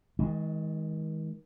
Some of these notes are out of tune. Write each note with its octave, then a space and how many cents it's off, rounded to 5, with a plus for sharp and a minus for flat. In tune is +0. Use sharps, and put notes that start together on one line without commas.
D#3 +40 G#3 +0